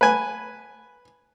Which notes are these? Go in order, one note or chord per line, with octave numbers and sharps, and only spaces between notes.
B4 G#5